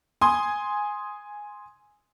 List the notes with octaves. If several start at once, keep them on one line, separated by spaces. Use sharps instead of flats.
G#5 C6 D#6